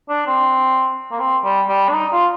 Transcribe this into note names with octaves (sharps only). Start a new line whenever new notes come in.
D4
C4
A#3
C4
G3
G3
D4
D#4
F4